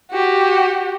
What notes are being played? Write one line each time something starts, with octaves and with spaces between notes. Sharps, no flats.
F#4 G4